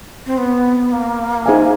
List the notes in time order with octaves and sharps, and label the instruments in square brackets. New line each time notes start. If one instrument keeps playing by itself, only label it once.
[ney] C4
B3
A#3
[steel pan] D#4 G#4 C5 E5 G#5